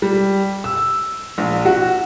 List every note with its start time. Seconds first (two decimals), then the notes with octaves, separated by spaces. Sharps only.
0.02 G3
0.64 E6
1.38 A#1
1.65 F#4